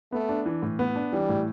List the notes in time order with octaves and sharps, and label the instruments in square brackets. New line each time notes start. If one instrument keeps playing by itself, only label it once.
[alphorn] A3 [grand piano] B3
[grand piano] D4
E3
A2
B3
D4
[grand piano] E3 [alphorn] G3
[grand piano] A2